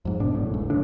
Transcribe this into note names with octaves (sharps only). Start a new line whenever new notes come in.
F2 G#2
G#2 B2 D4
F#1 A2
C#2
F1 A#1 A2 D4